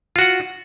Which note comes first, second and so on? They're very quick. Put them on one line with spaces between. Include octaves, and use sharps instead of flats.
F4 F#4 F#5